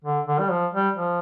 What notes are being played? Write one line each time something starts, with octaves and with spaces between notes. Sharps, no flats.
D3
D3
G3
F3
G3
F3